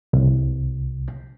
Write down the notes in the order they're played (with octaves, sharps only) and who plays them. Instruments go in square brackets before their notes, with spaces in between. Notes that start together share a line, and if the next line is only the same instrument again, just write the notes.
[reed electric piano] C2